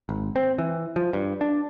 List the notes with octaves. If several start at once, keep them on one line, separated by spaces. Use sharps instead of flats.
G#1
C4
E3
F3
G2
D4